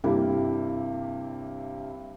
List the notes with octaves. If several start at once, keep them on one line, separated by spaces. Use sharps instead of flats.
G2 C3 A#3 E4 G4